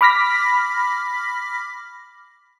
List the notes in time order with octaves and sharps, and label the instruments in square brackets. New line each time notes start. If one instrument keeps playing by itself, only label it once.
[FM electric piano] B5 D6 F6 A#6 B6